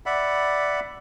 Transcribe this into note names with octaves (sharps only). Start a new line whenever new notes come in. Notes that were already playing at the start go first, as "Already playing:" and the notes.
D5 E5 F#5 B5